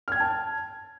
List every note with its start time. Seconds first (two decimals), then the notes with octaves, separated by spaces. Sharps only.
0.08 F6
0.12 G#6
0.16 G5
0.20 A5